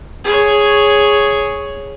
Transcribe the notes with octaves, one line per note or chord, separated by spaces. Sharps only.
G#4 C#5